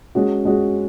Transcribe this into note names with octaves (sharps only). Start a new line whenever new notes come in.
G#3 C#4 F#4
G#3 C#4 F#4